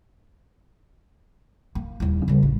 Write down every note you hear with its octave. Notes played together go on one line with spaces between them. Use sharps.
A#3
D#1 E4
C#3 G3
A1